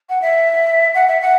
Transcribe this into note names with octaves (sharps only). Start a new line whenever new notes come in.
F#5
E5
F#5
E5
F#5